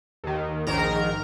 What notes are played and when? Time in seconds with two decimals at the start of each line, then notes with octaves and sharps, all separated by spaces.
0.24 D#2 D#3
0.67 A#1 G#2 D#3 A#4 A#5